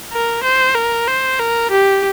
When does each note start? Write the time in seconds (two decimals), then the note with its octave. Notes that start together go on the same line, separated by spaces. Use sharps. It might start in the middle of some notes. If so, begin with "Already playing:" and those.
0.12 A#4
0.43 C5
0.75 A#4
1.08 C5
1.39 A#4
1.71 G4